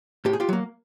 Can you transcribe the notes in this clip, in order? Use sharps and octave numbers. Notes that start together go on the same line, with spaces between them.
A2 G4
G#4
F4 G4
F#3 A#3